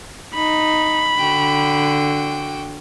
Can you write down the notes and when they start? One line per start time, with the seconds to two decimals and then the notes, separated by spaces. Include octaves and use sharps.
0.35 D#4 B5
1.18 D3 F#4 G5